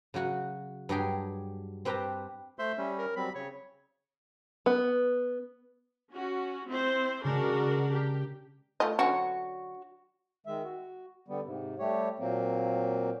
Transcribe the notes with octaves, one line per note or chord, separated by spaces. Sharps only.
C#3 F#3 F#4 F#5
G2 F#3 G4 G#4 G5
C4 G4 B4 G5 A5 A#5
A3 C5 E5 C6
G3 C#4
A#4
F#3 G3 C4 B5
C#3 C#5
B3
C#4 F#4
C4 E4 C5
C#3 G#3 D4 F#4 A#4
G4
A3 F4 D#5
D3 F#3 C#4 F#4 C#6
D#3 G#3 E5
F#4
D3 G3 B3
G#2 C3
G3 A3 G4 C#5
A#2 F#3 A#3 C4